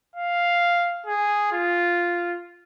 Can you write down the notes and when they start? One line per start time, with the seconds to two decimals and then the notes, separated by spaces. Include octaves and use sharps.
0.16 F5
1.07 G#4
1.52 F4